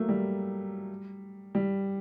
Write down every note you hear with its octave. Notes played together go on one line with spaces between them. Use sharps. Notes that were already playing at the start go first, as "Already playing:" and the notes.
Already playing: F#3 A3 A#3
G3
G3